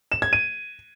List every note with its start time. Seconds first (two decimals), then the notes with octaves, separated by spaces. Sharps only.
0.12 E7
0.22 G#6
0.33 D#7